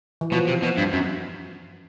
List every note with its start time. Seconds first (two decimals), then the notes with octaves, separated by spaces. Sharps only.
0.21 E3
0.32 B2 F3
0.48 C3
0.63 B2
0.78 G2
0.93 F#2